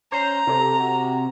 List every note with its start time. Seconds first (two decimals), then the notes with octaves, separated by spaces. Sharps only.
0.12 C#4 C5 A#5
0.47 C3 A4
0.79 F#4